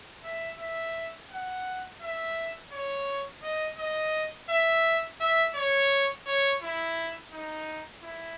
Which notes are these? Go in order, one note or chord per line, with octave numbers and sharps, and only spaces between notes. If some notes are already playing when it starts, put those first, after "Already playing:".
E5
E5
F#5
E5
C#5
D#5
D#5
E5
E5
C#5
C#5
E4
D#4
E4